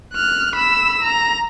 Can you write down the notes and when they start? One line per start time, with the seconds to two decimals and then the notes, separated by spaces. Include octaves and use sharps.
0.13 F6 F#6
0.56 B5 E6
1.03 A#5